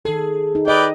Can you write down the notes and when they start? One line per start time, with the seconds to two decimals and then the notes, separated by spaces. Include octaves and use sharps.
0.05 D#3 G#4 A4
0.55 D#4
0.68 G4 B4 D5 D#5 G5